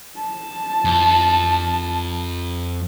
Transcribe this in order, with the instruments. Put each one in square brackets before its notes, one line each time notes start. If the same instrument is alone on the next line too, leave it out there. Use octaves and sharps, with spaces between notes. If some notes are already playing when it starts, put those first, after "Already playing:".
[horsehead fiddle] A5
[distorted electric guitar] F2